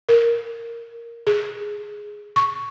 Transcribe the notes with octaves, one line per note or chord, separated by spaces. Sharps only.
A#4
G#4
C#6